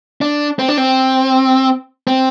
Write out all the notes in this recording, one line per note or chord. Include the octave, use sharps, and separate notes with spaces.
D4
C4
D4
C4
C4